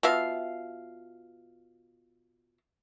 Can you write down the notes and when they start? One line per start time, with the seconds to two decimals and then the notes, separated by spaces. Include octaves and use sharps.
0.03 B2 F4 E5 F5